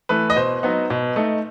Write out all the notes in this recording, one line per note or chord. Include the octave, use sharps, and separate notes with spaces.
E3 A3 B4
D#5
B2 C5
F#3 B3 D#4
B2
A3 D#4